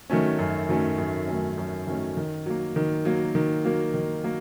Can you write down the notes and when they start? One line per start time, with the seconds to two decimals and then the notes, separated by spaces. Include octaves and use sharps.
0.10 D#3 F#3 A3 C#4
0.39 F#2
0.69 D#3 F#3 A3 C#4
0.98 F#2
1.28 D#3 F#3 A3 C#4
1.58 F#2
1.87 D#3 F#3 A3 C#4
2.17 D#3
2.46 F#3 A#3
2.76 D#3
3.05 F#3 A#3
3.35 D#3
3.64 F#3 A#3
3.94 D#3
4.24 F#3 A#3